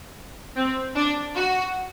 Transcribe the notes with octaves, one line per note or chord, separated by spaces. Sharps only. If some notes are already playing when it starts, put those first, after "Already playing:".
C4
D4
F#4